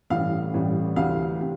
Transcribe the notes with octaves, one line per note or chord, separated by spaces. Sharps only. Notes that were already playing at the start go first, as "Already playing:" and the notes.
A1 A2 E3 G3 F5
A1 A2 E3 G3
D2 C3 E3 F5
C3